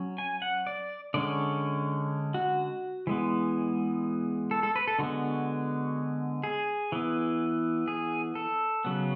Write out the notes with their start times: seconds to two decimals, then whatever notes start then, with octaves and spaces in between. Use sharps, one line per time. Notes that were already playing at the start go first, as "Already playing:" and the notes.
Already playing: F#3 C#4
0.18 G#5
0.42 F#5
0.67 D5
1.14 D3 G#3 C#4 D5
2.34 F#4
3.07 E3 G#3 B3
4.51 A4
4.63 A4
4.76 B4
4.88 A4
4.99 D3 G#3 B3 F#4
6.44 G#4
6.92 E3 B3
7.88 G#4
8.35 A4
8.85 C#3 F#3 B3